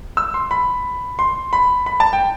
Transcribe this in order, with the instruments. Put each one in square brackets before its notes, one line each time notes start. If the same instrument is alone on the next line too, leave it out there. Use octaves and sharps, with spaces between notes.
[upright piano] E6
C6
B5
C6
B5
B5
A5
G5